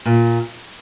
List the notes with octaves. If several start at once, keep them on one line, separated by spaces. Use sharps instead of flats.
A#2